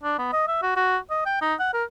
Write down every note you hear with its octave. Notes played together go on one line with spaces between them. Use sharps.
D4
B3
D#5
E5
F#4
F#4
D#5
G5
D#4
F#5
A#4